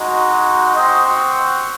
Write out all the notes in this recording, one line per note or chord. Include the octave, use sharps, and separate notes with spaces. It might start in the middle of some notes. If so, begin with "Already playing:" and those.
Already playing: G#3 D#4 F#4
C4 F#4 C5 D#5